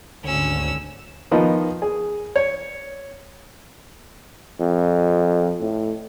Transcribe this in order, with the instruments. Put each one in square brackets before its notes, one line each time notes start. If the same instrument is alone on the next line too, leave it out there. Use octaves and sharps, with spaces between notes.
[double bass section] G#1 D3 [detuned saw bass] D2 [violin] C#4 E6
[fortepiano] D#3 F3 B3 D#5
G#4
C#5
[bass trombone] F2
A2